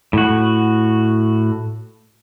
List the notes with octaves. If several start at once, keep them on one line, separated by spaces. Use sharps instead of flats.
A2 F#4